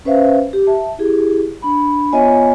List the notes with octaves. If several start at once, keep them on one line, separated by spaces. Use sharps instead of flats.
C#4 B4 C5 E5 F5
G4
E5 A5
E4 G4 G#4
D4 B5
B3 F4 C#5 D#5 E5 G#5